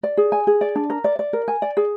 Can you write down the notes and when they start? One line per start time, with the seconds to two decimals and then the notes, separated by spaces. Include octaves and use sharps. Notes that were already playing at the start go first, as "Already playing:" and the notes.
0.03 D5
0.17 G#4
0.32 G#5
0.47 G#4
0.61 D5
0.75 D4
0.90 A#4
1.04 D5
1.19 D5
1.33 A#4
1.48 G#5
1.62 D5
1.77 G#4